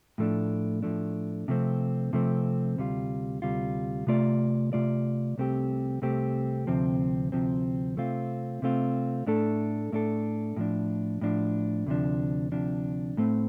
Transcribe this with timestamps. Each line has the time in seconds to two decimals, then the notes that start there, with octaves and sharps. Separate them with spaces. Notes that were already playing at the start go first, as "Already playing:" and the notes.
0.18 A2 F3 A3 D4
0.82 A2 F3 A3 D4
1.48 C3 F3 A3 C4
2.13 C3 F3 A3 C4
2.78 D2 C3 G3 F4
3.42 D2 C3 G3 F4
4.07 C3 A3 F4 D5
4.73 C3 A3 F4 D5
5.38 C2 C3 A3 C4 G4
6.02 C2 C3 A3 C4 G4
6.67 D2 C3 F3 C4
7.32 D2 C3 F3 C4
7.97 C3 A3 C4 F4
8.62 C3 A3 C4 F4
9.27 A2 A3 D4 A4
9.92 A2 A3 D4 A4
10.56 A2 F3 D4
11.21 A2 F3 D4
11.86 D2 C3 F3 D4
12.52 D2 C3 F3 D4
13.17 A2 A3 C4